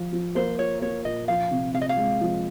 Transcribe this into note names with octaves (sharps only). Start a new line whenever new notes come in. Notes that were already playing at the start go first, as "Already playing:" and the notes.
Already playing: F3 F4
F3
A#3 C5
F4 C#5
A#3 C#5
A#2 D#5
F3 F5
C3
C3 F5
D#5
F5
G#3
F3